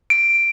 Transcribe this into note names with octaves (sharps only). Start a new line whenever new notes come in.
D7